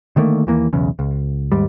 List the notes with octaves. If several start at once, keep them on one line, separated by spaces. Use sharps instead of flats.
D3 D#3 A3 A#3
D#2 E3 A#3
B1 E2 C#3
C#2
D#2 G#2 G3